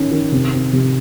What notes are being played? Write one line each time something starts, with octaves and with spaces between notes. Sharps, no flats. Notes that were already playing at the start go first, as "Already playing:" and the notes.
Already playing: D#3 C#4
D#3
C3
C4
C3